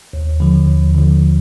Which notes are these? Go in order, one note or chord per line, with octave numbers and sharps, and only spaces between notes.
D#2
D3 F3
D#2
D3 F3